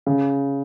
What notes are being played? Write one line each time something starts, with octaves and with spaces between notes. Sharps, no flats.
C#3